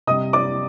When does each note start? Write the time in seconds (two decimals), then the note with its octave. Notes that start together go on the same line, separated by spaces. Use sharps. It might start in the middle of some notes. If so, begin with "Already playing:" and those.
0.07 C3 G3 D#5 D#6
0.33 D5 D6